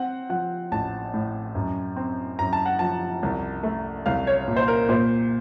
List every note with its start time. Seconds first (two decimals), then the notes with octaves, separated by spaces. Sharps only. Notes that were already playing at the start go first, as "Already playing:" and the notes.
Already playing: C4 F#5
0.30 F3 F#5
0.72 A1 A5
1.14 A2
1.55 F#2
1.96 C4
2.39 F#2 A#5
2.53 A5
2.66 F#5
2.79 F3 A5
3.23 C2
3.63 A3
4.06 C2 F5
4.27 C#5
4.48 A#2
4.56 C5
4.68 A#4
4.89 A#2 C5